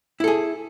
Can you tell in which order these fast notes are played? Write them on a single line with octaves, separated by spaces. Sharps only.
E4 A4 G#4